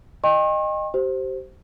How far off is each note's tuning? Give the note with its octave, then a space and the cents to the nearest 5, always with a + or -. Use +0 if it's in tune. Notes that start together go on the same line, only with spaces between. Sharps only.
D#5 -15 G5 +30 C#6 -45
G4 -30 C5 +0